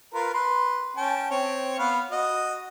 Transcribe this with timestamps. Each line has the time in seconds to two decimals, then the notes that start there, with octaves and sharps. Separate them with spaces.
0.14 F4 A#4 B4
0.34 B4 C6
0.97 C#4 G5 A5
1.31 C4 C#5
1.79 B3 B4 F5
2.12 F#4 D#5